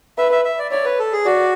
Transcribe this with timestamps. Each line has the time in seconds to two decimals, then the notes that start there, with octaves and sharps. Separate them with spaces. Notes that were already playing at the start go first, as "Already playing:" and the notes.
0.18 B4 E5
0.32 E5
0.45 E5
0.59 D5
0.71 C#5 D5
0.85 B4
0.99 A4
1.12 G#4
1.25 F#4 D5